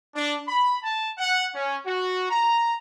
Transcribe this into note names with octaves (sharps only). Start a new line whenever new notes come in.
D4
B5
A5
F#5
C#4
F#4
A#5